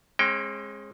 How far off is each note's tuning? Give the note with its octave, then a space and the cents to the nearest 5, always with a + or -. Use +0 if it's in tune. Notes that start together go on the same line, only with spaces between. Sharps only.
G#3 +0 C#4 -45 G5 +0